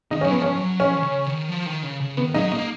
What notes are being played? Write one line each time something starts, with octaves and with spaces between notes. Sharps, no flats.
D#3 D#4
F#3 C#4
F3 B3
F3 C#4
F#3
F3 C#4
D#3
C#3
D#3
F3
D#3
C#3
C#3
D#3 B3
F#3 D#4
A#3 D#4